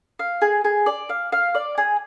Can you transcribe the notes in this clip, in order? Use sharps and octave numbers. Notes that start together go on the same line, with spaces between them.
F5
G#4
G#4
D5
F5
F5
D5
G#4